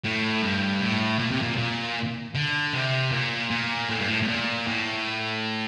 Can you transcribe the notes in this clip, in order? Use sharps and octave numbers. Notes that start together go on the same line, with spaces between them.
A2
G2
A2
A#2
C3
A#2
A#2
D3
C3
A#2
A#2
A2
G2
A2
A2
A#2
A2